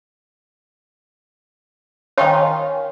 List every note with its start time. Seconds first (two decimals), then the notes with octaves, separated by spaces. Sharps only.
2.18 D#3 C#4 F4 C#5 G5